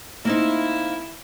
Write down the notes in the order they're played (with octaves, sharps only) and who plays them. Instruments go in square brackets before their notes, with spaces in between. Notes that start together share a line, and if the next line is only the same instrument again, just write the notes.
[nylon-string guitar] A#3 C4 D#4 [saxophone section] E4